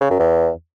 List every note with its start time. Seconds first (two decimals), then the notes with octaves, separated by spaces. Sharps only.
0.01 C#3
0.10 F#2
0.19 E2